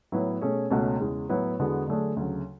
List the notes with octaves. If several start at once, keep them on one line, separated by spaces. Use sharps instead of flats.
A2 F#3 B3 E4 B4
B2 A3 C#4 G#4
C#2 B2 A3 C#4 F#4
E2 C#3 G#3
A2 F#3 B3 E4 B4
E2 D3 G#3 B3 F#4
D3 F#3 A3 D4 G#4
D2 C#3 F#3